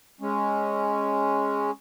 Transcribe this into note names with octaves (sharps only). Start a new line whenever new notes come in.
G#3 C#4